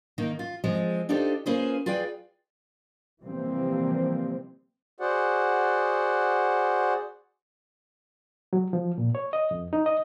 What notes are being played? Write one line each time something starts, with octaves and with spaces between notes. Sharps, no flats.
D#3 A#3 D#4
F4
F3 G#3 C4
D4 D#4 F4 G4 A4 C5
A#3 C#4 F4 G#4 B4 C5
F4 G#4 B4 D5 G5
C3 E3 F3 G3 A#3 C4
F#4 G#4 C5 D5 F#5
F#3
F3
A#2
C#5
D#5
F2
D#4
D#5